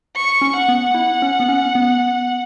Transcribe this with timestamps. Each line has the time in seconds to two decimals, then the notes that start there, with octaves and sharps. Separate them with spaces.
0.16 C#6
0.42 C#4
0.56 F#5
0.69 B3
0.95 E4
1.22 C#4
1.40 B3
1.48 C#4
1.75 B3